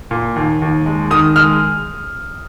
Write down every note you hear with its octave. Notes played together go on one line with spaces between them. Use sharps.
A#2
D#2
D#2
G#3
D#3 D#6
G#3 F6